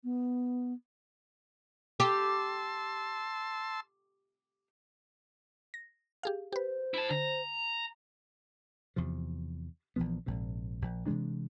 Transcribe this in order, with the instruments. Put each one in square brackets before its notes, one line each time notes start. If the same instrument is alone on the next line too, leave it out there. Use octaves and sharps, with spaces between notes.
[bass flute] B3
[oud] G4 [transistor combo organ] A5 C6 E6
[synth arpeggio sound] A#6
G4 G#4 F5
[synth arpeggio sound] G4 B4 [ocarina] C5
[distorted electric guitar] E4 A5
[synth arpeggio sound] D3 [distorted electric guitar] A#5
[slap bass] E2 C3 F3
A#1 E3 F3 B3
A#1 G#2 C3
A#1
C3 E3 G#3 D4